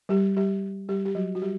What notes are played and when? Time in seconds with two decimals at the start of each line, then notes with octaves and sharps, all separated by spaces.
0.09 G3 G4
0.37 G3 G4
0.89 G3 G4
1.05 G4
1.15 F#3 F#4
1.35 F#4
1.42 G3 G4